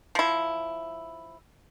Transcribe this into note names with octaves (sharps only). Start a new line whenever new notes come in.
F3 E4